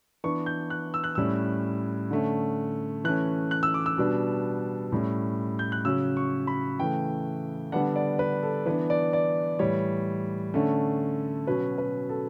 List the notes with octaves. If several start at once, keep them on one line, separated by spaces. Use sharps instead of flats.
E3 B3 D4 C#6
G6
F#6
E6
F#6
A2 G3 C#4 E6
D3 A3 C#4
E3 A3 C#4 F#6
F#6
E6
D6
E6
B2 G3 B3 D4
A2 G3 C#4
G6
F#6
C#3 F#3 C#4 E6
C#6
B5
C#3 E3 A3 G5
D3 G3 B3 D4 F#5
D5
B4
A4
E3 B3 D4 B4
D5
D5
A2 E3 G3 C#5
D3 A3 C#4
B2 F#3 C#4 B4
B4
A4